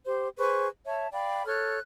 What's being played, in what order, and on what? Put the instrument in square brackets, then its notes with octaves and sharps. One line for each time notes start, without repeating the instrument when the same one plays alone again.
[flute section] G4 C5
G#4 B4 C5 C#6
C#5 E5 A5
D5 F5 G5 B5
A4 C#5 F6 F#6